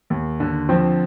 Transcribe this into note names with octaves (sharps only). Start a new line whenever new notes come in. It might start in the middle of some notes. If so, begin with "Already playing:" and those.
D#2
D3
F3 C4